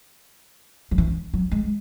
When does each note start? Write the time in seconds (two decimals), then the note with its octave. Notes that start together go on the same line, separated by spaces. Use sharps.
0.91 F#3
0.98 E3
1.34 F#3
1.51 G#3